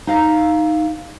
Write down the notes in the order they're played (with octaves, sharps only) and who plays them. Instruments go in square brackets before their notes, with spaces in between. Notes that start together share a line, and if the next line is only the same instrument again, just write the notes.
[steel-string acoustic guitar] D#4 F5 A#5